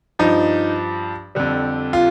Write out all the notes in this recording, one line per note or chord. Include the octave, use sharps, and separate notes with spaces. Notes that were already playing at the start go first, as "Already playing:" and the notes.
G2 F3 D#4
F2 D3 G3
F4